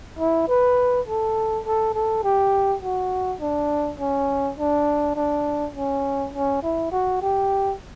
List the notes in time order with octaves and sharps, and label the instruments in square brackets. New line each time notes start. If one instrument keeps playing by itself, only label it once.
[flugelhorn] E4
B4
A4
A4
A4
G4
F#4
D4
C#4
D4
D4
C#4
C#4
E4
F#4
G4